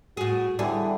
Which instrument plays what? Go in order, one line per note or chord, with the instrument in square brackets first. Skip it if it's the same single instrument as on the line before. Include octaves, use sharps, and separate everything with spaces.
[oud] A2 G#4 [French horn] F#4
[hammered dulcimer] D3 E3 B3 [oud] G3 G#4 [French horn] E4